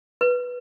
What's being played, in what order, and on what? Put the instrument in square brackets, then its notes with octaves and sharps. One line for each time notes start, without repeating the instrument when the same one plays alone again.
[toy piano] B4